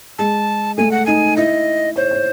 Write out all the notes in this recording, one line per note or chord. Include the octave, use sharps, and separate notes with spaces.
G#3 A5
A3 G#5
F#5
D#4 G#5
E4 D#5
C5 C#5
C#5